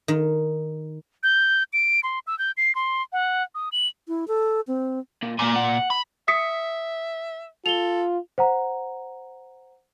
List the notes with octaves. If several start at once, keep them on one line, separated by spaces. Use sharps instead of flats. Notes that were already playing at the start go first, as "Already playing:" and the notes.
D#3
G6
D7
C6
E6
G6
C7
C6
F#5
D#6
F#7
E4
A4
C4
A#2
A#2 A#3 G#5
F#5
B5
E5 D#6 B6 C#7
F4 A4 F7 G7
C5 F#5 A#5